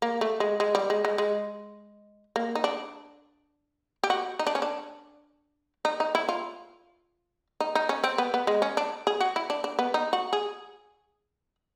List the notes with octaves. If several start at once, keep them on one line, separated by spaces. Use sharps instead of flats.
A#3
A3
G#3
G#3
G3
G#3
G#3
G#3
A#3
D#4
D4
G4
F#4
D#4
D4
C#4
D4
D#4
D#4
E4
F4
D#4
D#4
C#4
C4
B3
B3
G#3
C#4
D4
G#4
F#4
E4
D4
D4
B3
D#4
F#4
G#4